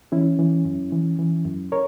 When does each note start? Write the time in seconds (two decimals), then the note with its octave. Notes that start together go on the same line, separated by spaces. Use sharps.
0.12 E3 C#4 E4
0.39 E3
0.65 F#2
0.92 E3
1.19 E3
1.45 F#2
1.72 A#4 C#5